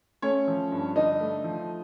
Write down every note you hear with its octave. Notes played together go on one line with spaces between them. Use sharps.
A3 C#4 C#5
F3
G2
D3 D#4 D#5
A3
F3